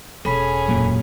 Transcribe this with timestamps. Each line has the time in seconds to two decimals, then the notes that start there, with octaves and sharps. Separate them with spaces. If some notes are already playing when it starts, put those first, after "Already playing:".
0.25 E1 C#4 G#4 A4 B5 B6
0.68 F#2 A#2